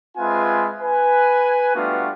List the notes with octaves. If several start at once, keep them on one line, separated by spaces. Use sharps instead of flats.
G#3 C4 F4 B4 E5 G#5
B4 G#5
G3 A3 B3 D4 F4 F#4